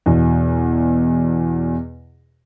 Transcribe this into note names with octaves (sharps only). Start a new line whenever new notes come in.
E2 B2